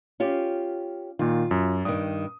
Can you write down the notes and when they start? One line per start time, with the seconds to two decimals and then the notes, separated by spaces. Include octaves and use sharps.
0.20 C#4 F4 G4
1.19 A#2 D#3 F4
1.51 F#2
1.85 G2 D#3 D#6